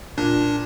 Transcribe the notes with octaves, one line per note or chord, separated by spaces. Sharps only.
A#2 D4